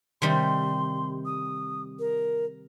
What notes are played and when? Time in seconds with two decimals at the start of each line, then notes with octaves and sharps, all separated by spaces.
0.22 C3 D#3 G3 C6
1.25 D#6
1.99 A#4